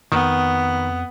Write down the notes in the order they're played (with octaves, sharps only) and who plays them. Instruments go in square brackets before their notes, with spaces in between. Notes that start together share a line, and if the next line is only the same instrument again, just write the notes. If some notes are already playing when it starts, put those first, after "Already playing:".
[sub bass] F2 [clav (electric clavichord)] D#3 [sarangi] B3